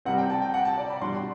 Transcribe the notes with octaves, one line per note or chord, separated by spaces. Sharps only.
C3 G3 C4 F#5
G5
A5
G5
F#5
A5
D5
B5
B2 G3 D4 F#4 C6